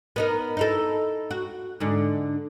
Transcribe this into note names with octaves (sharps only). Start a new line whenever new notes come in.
B3 D#4 A#4
D#4 E4 A4
F#4
G#2 D3